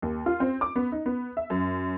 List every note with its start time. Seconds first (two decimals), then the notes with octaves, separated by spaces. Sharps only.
0.02 D#2
0.26 F4
0.40 C4
0.61 D6
0.76 B3
0.92 D#4
1.06 B3
1.37 E5
1.50 F#2